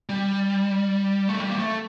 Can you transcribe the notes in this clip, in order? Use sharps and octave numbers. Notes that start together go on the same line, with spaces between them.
G3
A3
G3
A#3
A3